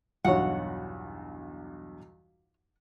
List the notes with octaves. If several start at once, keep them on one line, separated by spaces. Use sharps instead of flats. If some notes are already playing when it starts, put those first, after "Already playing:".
B1 E2 G2 F4 F#4 C#5 F#5